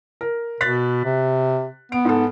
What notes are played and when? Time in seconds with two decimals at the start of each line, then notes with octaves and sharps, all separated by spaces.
0.21 A#4
0.61 B2 F#6 A6 B6
1.05 C3
1.92 B3 D7
2.05 G#2 A4